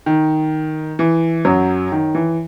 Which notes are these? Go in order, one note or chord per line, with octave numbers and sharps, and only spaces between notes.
D#3
E3
F#2 F#3
D#3
E3